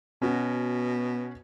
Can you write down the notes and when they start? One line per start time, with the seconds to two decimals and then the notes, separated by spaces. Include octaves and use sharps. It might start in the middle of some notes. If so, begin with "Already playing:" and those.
0.22 B2 C#4 F#4